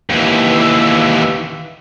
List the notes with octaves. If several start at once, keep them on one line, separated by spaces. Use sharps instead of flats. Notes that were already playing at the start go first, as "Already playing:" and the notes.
D#2 E3